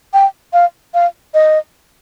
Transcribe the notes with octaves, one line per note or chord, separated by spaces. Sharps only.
G5
F5
F5
D#5